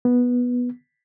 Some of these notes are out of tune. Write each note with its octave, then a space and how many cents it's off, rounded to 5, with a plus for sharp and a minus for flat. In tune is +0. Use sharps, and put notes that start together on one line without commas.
B3 -10